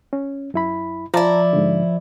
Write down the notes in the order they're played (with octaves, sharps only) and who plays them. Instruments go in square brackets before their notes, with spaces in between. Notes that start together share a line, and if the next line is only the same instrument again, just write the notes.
[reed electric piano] C#4
F#2 E4 B5
[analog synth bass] F3 [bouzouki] E4 D5 [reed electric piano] A5 A#5
[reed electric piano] G#2 D3